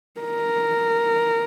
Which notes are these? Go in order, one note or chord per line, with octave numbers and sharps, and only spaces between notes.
A#4